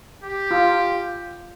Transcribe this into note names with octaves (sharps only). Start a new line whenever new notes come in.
G4
F4